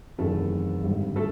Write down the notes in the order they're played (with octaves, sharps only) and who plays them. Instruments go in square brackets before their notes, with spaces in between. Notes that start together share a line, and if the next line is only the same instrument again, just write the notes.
[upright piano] F#1 E2 C3 D#3 [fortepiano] A3 A4
[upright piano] G#1 G2 D3
[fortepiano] A3 A4